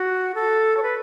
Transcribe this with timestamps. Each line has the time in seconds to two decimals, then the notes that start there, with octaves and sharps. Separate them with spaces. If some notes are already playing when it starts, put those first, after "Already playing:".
Already playing: F#4
0.35 A4
0.77 C#5
0.83 B4